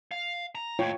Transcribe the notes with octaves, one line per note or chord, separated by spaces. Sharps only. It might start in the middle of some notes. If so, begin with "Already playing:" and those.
F5
A#5
D#2 A2 F4 C#5 G5